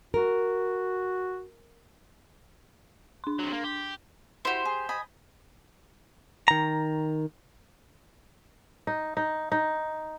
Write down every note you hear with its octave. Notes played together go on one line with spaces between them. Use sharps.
F#4 A#4
D4 C6
C3 F#3
A#3
G4
E4 F#4 G4 C5
G#4
D#5 G#5 B5
D#3 A#5
D#4
D#4
D#4